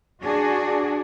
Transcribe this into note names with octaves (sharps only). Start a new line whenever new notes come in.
D4 F#4 G#4